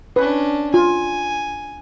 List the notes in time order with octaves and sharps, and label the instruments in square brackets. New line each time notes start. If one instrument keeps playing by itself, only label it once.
[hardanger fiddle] C#4 D4 [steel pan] B4
[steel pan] F4 [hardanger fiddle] G#5